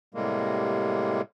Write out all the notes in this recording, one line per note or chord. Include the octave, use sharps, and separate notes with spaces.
A2 C3 G3 G#3 A#3